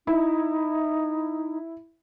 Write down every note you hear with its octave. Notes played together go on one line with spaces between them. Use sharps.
D#4 E4